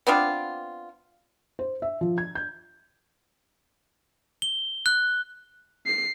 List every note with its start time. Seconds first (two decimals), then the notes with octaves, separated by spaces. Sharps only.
0.07 B3 C4 D4 F4
1.59 C5
1.82 E5
2.01 F3
2.18 G#6
2.35 G6
4.42 G7
4.86 F#6
5.86 C7